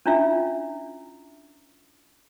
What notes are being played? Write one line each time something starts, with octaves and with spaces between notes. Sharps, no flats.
C#4 D4 E4 F4 E5